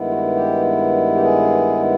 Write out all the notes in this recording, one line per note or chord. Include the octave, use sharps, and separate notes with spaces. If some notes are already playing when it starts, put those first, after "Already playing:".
Already playing: G2 D#3 G#3 B3 E4
F4
F#4
G4
G4
G#4